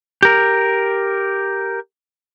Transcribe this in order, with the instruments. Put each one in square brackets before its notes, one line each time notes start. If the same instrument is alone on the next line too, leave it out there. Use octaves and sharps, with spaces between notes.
[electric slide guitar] G4 A#4